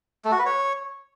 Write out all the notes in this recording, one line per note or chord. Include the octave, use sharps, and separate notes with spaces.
A3
F#4
B4
C#5